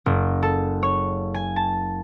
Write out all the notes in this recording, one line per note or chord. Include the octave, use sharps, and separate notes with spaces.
F#1
A4
C#5
G#5
A5